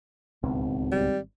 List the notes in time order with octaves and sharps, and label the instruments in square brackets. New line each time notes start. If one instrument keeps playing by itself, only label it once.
[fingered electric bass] D1 C#2 B2 [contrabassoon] G#1
[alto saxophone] G3